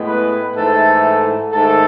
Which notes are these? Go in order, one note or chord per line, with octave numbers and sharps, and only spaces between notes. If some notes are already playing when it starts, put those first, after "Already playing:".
Already playing: A2 G#3 B3
B4
G#2 E3 A3 A4
G#2 D#3 A3 A4